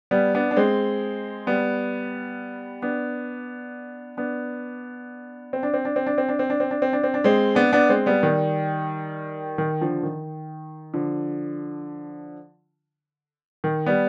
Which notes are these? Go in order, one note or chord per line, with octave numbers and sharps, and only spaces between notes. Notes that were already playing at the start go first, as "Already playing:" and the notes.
G3 B3
B3 D4
D4
G#3 C4
G3 B3
B3 D4
B3 D4
C4
D4
C4
D4
C4
D4
C4
D4
C4
D4
C4
D4
C4
D4
C4
D4
G#3 C4
B3 D4
B3 D4
G#3 C4
G3 B3
D#3 G3
D#3
D3 F3
D#3
D3 F3
D#3
G3 B3